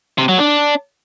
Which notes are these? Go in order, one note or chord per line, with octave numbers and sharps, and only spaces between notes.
C3
F#3
D4